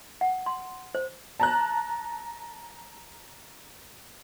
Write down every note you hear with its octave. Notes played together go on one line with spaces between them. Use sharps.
F#5
C6
C5
A5 A#5 F#6